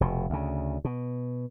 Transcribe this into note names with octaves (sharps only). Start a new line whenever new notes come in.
F1 B2
D2 C#3
B2